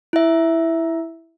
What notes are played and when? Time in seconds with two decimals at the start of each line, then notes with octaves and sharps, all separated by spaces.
0.13 E4 E5